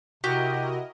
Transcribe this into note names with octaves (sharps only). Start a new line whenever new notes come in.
C3 E4 F#4 G4 A#4 D#5